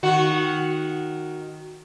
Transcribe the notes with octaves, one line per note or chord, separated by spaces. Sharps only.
D#3 F#4